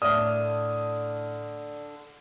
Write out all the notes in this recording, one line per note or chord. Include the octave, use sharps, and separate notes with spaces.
A2 D3 A3 D5 E5 D#6 F6